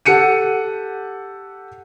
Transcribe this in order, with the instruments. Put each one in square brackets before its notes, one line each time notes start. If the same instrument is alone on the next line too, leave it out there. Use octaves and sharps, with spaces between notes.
[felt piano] G4 A4 F#5 C#7 D#7